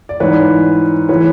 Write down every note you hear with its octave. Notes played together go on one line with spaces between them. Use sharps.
D5
G#2 E3 B4 C#5
A2 E3 B4 C#5